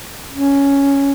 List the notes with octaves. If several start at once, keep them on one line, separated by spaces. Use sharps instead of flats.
C#4